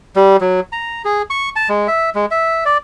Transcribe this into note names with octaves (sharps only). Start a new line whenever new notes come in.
G3
F#3
A#5
G#4
C#6
A5
G#3
E5
G#3
E5
D5